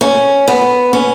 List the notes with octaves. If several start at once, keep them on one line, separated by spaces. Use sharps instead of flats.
C#4
B3
C#4